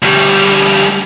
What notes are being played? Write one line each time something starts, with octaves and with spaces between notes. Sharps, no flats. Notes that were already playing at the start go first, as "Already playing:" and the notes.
D2 G3